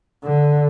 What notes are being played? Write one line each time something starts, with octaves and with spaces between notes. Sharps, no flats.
D3